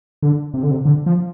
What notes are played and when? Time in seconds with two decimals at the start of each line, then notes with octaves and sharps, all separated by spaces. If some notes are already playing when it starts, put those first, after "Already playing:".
0.23 D3
0.54 C3
0.63 D3
0.71 C3
0.85 D3
1.06 F3